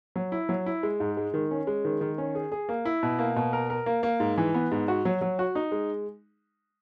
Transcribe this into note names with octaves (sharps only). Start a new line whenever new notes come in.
F#3
E4
F#3
E4
G#3
G#2
G#3
D#3
C#4
G#3
D#3
D#3
C#4
G#4
G#4
A#3
E4
B2
A#3
B2
A#4
A#4
A#3
A#3
G#2
E3
B3
G#2
F#4
F#3
F#3
F#4
D#4
G#3